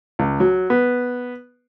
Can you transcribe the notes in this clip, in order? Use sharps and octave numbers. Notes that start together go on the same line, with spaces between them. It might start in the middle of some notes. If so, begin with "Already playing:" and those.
C#2
F#3
B3